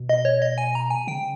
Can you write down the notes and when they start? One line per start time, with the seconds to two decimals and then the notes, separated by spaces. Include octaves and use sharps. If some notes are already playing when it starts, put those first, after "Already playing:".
Already playing: B2
0.09 D#5
0.25 C#5
0.42 D#5
0.58 G#5
0.75 A#5
0.90 G#5
1.07 C#3 G5